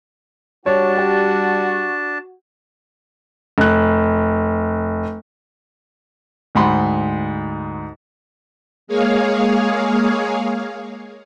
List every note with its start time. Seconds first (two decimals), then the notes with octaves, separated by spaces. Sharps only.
0.66 G3 D4 F#4 C#5 A5
0.97 G4
3.58 F1 F#6
6.55 D2 G#2 F#5 B5 C6
8.87 G#3 A#3 G#4 C#5 F5